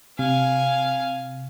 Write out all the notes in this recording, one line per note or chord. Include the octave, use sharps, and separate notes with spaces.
C3 F5 G#5